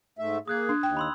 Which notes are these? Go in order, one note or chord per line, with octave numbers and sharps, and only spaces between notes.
G#2 A3 E5
A#3 G#4 D#6 F#6 G#6
D4
D#2 G5
B5 C6 E6